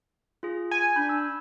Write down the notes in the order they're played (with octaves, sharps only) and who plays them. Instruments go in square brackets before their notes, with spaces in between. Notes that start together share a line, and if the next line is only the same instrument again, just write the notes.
[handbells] F4 G#4
[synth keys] G#5
[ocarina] D4 [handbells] B5 G6
[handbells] E6